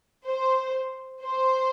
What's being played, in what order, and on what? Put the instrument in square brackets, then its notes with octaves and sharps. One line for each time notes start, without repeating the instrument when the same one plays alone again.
[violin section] C5
C5